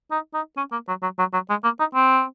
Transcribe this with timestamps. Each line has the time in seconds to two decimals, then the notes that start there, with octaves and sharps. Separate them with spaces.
0.11 D#4
0.34 D#4
0.57 C#4
0.72 A#3
0.88 F#3
1.02 F#3
1.19 F#3
1.33 F#3
1.49 G#3
1.64 A#3
1.79 D#4
1.95 C4